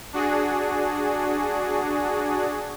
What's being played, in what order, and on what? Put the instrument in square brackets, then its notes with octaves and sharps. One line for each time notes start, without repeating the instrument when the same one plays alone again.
[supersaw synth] D4 F#4 G#4